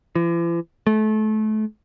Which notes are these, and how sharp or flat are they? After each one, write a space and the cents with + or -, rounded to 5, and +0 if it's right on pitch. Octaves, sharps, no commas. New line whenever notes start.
E3 +45
A3 -30